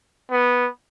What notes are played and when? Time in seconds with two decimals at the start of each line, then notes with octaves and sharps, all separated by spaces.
0.31 B3